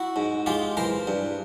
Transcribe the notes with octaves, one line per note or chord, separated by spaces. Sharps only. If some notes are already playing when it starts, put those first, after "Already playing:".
Already playing: E4 F#4
G#2
G#3 F4 G4
E3 A#4 C5
G2